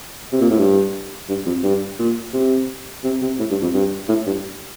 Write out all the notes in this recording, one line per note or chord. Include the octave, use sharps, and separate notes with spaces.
C3
A#2
A2
G2
G2
F2
G2
A#2
C3
C3
C3
A2
G2
F2
G2
A2
G2